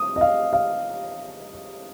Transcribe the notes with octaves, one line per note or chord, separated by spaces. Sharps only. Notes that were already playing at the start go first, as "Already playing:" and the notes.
Already playing: D#6
D#5
F5
F5